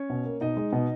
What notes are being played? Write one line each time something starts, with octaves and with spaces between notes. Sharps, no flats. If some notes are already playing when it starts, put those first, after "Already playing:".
Already playing: C#4 C#5
B2
A#3
B2 D#4 D#5
G#3
B2